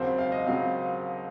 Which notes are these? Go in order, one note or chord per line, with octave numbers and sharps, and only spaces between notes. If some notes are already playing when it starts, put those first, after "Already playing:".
Already playing: D#2 C#3 F#3 C4 C5
F5
D#5
C#3 F#3 C4 F5